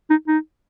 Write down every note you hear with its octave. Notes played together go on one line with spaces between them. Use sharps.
D#4
D#4